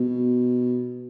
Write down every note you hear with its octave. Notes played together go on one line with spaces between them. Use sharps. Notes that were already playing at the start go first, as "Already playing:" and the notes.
Already playing: B2